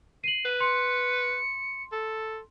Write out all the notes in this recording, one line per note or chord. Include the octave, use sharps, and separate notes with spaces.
C7 D#7 F#7
B4
C6 C#7
A4